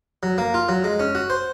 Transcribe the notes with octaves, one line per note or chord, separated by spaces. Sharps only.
F#3
A#3
F4
F#3
G#3
C#4
F#4
C5